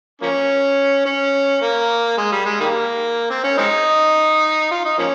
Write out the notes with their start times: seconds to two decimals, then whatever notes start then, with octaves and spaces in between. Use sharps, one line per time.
0.22 F3 A#3 C#4
1.06 C#4
1.62 A#3
2.18 G#3
2.32 G3
2.46 G#3
2.60 D#3 G3 A#3
3.30 C4
3.44 C#4
3.58 G#3 C4 D#4
4.71 F4
4.85 D#4
4.98 F3 A#3 C#4